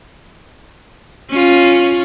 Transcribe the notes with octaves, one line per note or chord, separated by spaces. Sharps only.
C#4 F4